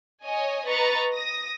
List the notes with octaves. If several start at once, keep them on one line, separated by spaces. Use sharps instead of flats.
C#5 D#5 G#5
B4 D#5 A#5 C#6 A6
D#6 A#6